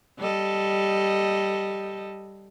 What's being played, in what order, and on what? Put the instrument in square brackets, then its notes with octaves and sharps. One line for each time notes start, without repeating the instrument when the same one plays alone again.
[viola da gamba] G3 A4 D#5